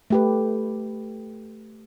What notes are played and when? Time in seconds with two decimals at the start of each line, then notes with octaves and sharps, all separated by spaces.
0.10 A3 G4 B4